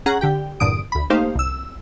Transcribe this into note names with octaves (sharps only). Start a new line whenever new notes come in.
C#4 G#4 F#5 A#5
D3 G4 G5
E2 G2 A#2 D3 D#6 D7
D2 B5
A3 A#3 D#4 G4 C5 F5
C2 E6